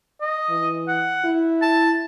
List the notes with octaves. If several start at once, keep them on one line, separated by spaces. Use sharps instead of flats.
D#5
E3
F#5
E4
A5